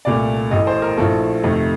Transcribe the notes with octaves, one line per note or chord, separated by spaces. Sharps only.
C2 A#2 A3 D5
A1 A2 A3 D#5
C5
A#4
A#1 A2 F3 A3 A4
F2 C3 D#3 A3